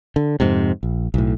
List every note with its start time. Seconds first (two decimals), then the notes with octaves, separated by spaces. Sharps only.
0.16 D3
0.40 F2 G#2 C3
0.83 A#1
1.14 B1 A2